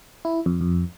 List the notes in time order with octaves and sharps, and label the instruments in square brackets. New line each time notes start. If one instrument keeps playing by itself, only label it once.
[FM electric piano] E4
F2
F2